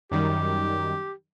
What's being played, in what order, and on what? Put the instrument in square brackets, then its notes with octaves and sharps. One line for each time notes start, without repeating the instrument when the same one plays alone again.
[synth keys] F#2 D#3 G3 [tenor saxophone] G4